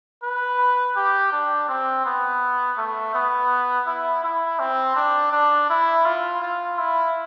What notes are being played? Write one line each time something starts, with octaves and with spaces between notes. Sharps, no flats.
B4
G4
D4
C4
B3
A3
B3
E4
E4
C4
D4
D4
E4
F4
F4
E4